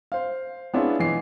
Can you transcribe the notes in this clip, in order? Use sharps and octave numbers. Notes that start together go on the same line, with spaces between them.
C5 F5
B3 C#4 D4 E4 F4 G#4
B2 E3 C7